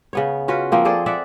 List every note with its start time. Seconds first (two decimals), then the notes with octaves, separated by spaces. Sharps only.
0.13 C#3 B3 C#5
0.48 C#4 F4 F#4 B4
0.72 F3 A#3 C4
0.85 G#4 A4 C5 D5
1.06 D5 E5 F#5